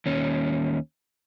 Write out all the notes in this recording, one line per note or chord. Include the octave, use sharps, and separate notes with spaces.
D#2 C#4